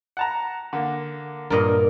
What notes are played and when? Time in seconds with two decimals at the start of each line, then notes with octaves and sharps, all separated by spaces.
0.17 F#5 A5 A#5
0.73 D3 A#3
1.50 G2 A#2 A#4 D#5